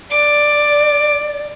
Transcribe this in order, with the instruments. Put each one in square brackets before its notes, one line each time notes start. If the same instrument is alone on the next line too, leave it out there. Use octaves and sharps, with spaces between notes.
[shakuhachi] D5 [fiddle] D6